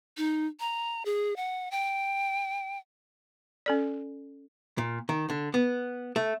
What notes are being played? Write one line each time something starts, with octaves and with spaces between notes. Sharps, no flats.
D#4
A#5
G#4
F#5
G5
C#4 A4 D5
A#2
D#3
D3
B3
A3